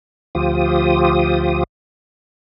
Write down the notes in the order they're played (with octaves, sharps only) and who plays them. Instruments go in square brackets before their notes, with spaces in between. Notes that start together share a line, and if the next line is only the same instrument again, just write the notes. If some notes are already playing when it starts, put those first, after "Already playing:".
[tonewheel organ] D2 F3 F4 G4 D#6